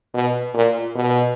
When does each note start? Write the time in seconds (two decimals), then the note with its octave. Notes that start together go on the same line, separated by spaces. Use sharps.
0.14 B2
0.54 A#2
0.96 B2